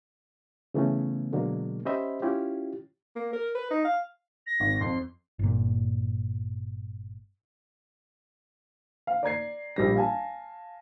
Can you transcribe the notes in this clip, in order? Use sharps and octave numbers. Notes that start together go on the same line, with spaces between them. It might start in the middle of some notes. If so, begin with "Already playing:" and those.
C#3 E3 A3 B3 C#4
B2 D3 F#3 G#3 A#3
C#4 G4 C5 D#5 E5 B5
C#4 E4 F4 G4
A#3
A#4
B4
D#4
F5
A#6
G#1
F2 C6
G1 A#2
F5
D5 A#5 G#6 C7
A#1 G3 A#6
F5 G#5 A5